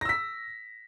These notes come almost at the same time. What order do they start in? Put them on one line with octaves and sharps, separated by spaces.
A#6 E6 B6